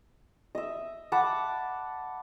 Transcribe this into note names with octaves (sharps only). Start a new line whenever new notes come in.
D#5 E5
F#5 A5 B5 D6